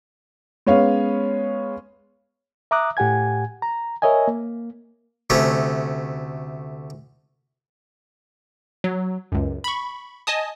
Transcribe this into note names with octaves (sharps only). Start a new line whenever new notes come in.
G#3 B3 C#4 C#5 F5
E5 A#5 D6 D#6 F#6
A2 G4 F#5 G#5 G#6
A#5
A#4 C#5 D#5 E5 G#5
A#3
D2 C3 A3 C#4
F#3
C#2 F#2
B5 C#6
D#5 G#5 A5 D#6